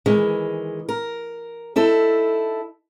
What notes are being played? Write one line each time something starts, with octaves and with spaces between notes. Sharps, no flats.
D#3 E3 G#3
A#4
D#4 E4 A4